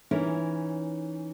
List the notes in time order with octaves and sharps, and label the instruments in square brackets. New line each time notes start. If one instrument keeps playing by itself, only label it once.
[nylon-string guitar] E3 C#4 D#4 E4 A#4 C#5